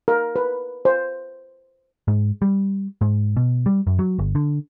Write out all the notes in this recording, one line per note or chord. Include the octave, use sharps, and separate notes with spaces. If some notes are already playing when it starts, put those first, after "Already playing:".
A#4
B4
C5
G#2
G3
G#2
B2
G3
F#2
F#3
G1
D3